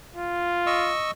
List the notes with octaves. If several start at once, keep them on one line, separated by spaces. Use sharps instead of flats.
F4
D#5 C#6 E6